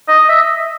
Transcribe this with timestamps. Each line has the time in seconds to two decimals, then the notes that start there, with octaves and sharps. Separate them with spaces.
0.08 D#5
0.29 E5